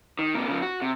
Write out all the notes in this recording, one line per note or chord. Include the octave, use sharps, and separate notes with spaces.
D#3
C3 A#3
C#3 F3
F#4
C3